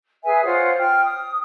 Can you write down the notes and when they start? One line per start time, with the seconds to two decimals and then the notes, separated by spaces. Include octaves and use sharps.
0.25 G#4 B4 E5 G#5
0.45 F4 C5 C#5 F#5
0.79 G5 F6
1.04 D#6